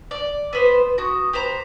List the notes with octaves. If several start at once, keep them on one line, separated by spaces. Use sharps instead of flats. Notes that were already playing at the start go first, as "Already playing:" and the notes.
D5
B3 B4 C5
F#4 D#6
G4 B4 C5 A#5